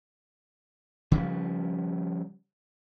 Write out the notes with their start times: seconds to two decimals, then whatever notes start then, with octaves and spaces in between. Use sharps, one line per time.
1.12 C#3 F3 G3